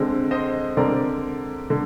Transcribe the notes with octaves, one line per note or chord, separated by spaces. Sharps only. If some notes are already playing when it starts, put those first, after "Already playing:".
Already playing: D3 G#3 C4
C5 D#5
D3 G#3 C4 A#4 D5
D3